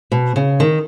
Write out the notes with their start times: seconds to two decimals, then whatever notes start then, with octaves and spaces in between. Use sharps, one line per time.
0.12 B2
0.36 C#3
0.60 D#3